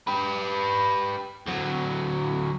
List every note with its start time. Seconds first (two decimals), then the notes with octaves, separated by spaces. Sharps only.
0.07 G4 B4
1.46 D2 F#3